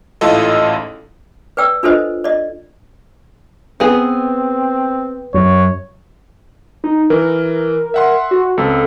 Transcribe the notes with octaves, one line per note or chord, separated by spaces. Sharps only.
A1 G#2 E4 F4 A4 D#5
B4 D5 G5 E6
D4 F4 A4 B4 C5 D#5
D5 D#5
B3 C4 G#4
F#2 C#5
D#4
E3 A#4
E5 F#5 C6
F#4
C#2 C4 A4